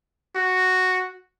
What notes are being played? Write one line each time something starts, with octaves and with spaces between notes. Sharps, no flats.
F#4